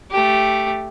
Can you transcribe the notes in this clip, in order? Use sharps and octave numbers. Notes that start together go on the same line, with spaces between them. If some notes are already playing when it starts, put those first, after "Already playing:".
A3 G4